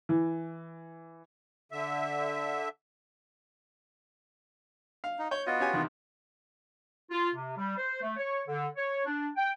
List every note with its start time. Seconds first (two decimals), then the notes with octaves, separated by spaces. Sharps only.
0.09 E3
1.72 D3 E5
5.04 F5
5.19 D#4
5.31 C#5 G6
5.47 B3 F4 F#4 D#5
5.60 C#4 G4 G#5
5.73 E2 C3 D#3
7.11 F4
7.35 C3
7.57 G3
7.77 C5
8.01 A3
8.17 C#5
8.48 D3
8.76 C#5
9.06 D4
9.37 G5